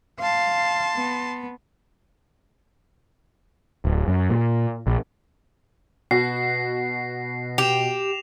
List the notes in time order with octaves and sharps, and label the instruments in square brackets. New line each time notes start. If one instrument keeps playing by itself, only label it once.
[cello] F5 [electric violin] A5 C6
[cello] B3
[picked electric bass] D1
F#2
A#2
A#1
[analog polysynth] B2 [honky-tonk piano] F#4 [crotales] A#6 C7
[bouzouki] G4 [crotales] E7 F7